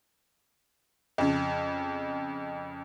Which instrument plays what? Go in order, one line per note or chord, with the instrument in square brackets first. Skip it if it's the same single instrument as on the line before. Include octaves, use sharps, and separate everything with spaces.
[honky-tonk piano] F2 C#3